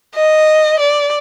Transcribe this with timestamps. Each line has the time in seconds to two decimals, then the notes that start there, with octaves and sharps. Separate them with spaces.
0.15 D#5
0.79 D5